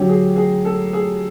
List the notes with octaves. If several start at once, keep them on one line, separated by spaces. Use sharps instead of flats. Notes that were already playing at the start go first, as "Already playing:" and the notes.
Already playing: D3 F#3 G4
G#4
G#4
A4
G#4